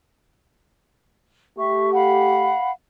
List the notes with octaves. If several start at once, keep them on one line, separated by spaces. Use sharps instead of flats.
A3 G4 E5 C#6
F5 F#5 B5